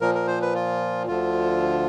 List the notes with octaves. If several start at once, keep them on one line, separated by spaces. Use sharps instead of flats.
A#2 F3 A#4
A#4
C5
B4
F4
D2 D3 F3 F4